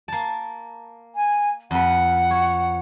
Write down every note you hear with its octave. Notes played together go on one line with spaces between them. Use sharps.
A#3 A5
G#5
F2 B4 F#5
C#5